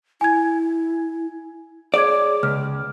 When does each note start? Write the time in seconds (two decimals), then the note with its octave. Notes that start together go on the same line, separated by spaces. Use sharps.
0.21 E4 G#5 G#6
1.94 G#4 C#5 D5 D6 G#6
2.43 C#2 F6